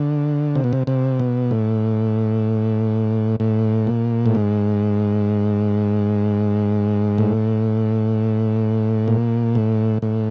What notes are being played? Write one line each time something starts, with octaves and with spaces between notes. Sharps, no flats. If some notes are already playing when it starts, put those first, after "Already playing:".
Already playing: D3
C3
B2
C3
C3
B2
A2
A2
A#2
A2
G#2
A2
A#2
A2
A2